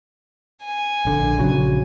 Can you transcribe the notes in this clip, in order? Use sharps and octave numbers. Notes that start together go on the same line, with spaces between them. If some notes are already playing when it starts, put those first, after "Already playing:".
G#5
A#1 D3
A#1 C#3 F#3